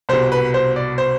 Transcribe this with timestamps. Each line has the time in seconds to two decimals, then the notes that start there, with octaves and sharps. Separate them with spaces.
0.09 C2 B2 C5
0.32 B4
0.54 C5
0.76 D5
0.98 C5